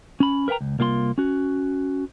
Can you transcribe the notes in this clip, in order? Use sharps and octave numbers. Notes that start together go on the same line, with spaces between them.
C#4 B5
A#4 B4 F5 G5 A#5
C#2
C2 A#3 F4 D5 C6
C#4 F#4